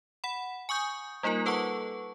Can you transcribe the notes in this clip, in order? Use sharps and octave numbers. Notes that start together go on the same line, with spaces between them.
F#5 B5
G#5 C#6 D#6 G6
G3 A#3 D#4 F4 A#4
A4 B4 F#5 A5 C#6